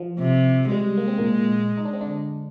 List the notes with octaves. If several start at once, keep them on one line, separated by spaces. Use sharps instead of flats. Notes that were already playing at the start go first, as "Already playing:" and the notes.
Already playing: F3
C3
G3 G#3
A#3
C4
A#2 A#3
D#4
D4
C4
D3 D4